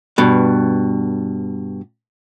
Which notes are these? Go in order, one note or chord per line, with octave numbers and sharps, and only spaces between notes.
G2 B2